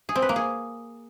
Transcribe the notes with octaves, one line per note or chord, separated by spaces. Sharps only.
G#4
C4
B4
A#3
G#4